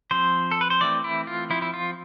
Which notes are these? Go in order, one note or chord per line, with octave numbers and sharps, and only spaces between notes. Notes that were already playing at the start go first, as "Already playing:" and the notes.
F3 C4 C5
A4
B4
C5
E3 A3 C4 D5
E4
F4
F3 C4 E4
E4
F4